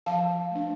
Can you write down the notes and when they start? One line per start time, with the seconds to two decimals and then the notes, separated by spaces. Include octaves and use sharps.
0.06 F3 F5 A5
0.51 A3 D4